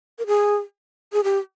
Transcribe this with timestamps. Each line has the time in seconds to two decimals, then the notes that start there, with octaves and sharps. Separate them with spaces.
0.19 A#4
0.27 G#4
1.13 G#4
1.24 G4